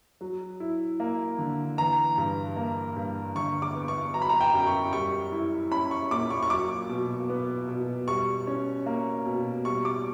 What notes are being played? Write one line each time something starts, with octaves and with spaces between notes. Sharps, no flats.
F#3
E4
A#3
D3
E3 A#5
G2
A#3
G2
D3 C#6
D6
B3
C#6
F#3 A#5
B5
A#5
G5
F#2
C#6
G3 C#6
E4
C#4 B5
C#6
A#2 D6
C#6
C#6
F#3 D6
B2
B3
B2
G3 C#6
C#4
A#3
B2
G3 C#6
D6